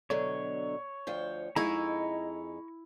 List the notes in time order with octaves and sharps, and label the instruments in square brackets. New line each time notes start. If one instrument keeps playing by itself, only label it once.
[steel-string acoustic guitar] B2 D3 F#3 [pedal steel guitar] C#5
[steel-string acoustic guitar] D2 F3 G5
[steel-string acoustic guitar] F2 G#3 D#4 [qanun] E4 [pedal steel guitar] A#5 C#6